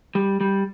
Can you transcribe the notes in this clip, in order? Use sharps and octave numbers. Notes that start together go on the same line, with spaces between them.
G3
G3